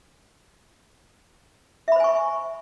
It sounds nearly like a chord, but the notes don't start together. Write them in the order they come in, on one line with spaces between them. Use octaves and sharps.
E5 B5 C5 G#5 C#6